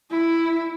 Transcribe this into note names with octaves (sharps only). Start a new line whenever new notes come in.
E4